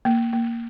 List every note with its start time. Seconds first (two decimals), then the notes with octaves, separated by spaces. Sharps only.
0.05 A#3
0.33 A#3